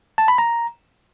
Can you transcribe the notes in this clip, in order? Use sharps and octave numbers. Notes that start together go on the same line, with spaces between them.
A5
B5
A#5